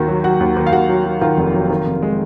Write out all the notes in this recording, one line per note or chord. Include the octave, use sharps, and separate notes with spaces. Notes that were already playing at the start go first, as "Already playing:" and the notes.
Already playing: D#2 D#3 F#4
F#3
F#3 F#4 F#5
D#2
D#3
F5
D#2 F#4 F#5
F#3
F#3
D#3 F4 F5
F1
F#3
D#3
F1
G#3